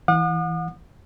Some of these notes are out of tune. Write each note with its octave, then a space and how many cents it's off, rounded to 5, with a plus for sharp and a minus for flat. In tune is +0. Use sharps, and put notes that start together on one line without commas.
E3 -10 F#5 -40 D#6 -40